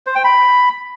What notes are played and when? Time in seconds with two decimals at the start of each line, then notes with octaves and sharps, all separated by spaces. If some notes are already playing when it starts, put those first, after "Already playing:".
0.07 C5
0.15 G5
0.24 B5